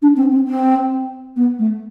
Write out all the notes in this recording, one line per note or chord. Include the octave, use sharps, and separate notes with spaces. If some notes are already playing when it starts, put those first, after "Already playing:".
D4
C4
C4
C4
B3
A3